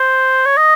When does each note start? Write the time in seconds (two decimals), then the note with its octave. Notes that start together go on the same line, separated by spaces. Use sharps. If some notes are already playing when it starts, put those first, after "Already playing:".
Already playing: C5
0.46 C#5
0.57 D#5